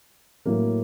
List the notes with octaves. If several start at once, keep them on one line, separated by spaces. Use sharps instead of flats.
A2 F#3 A#3